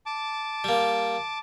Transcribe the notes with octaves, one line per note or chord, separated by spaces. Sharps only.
A5 D6
G3 A#3